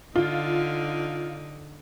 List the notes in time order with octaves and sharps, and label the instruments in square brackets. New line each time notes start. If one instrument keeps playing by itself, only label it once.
[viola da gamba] D3 D#4 [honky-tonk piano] F4